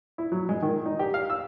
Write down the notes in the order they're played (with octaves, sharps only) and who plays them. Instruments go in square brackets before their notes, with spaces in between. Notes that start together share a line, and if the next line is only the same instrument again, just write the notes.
[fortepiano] E4
F#3
G#3
D#3
D#4
G4
F5
E6